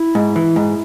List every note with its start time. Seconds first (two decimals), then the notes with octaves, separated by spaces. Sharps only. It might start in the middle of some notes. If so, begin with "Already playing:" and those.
Already playing: E4
0.15 G#2
0.36 E3
0.56 G#2